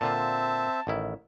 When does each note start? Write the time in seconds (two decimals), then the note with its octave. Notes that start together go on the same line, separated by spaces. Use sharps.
0.01 A#2 D3 C4 F4 E5 A5
0.87 A1 D#3 E4